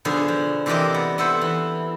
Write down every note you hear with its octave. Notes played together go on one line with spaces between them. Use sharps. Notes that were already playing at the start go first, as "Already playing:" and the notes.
B2 D3 F3 G#4
F3
C3 E3 G4 A#4 D5 D#5
B3
B3 E4 A4 C5
E3